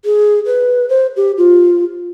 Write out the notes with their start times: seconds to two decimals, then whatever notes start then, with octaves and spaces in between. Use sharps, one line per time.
0.05 G#4
0.46 B4
0.89 C5
1.17 G4
1.38 F4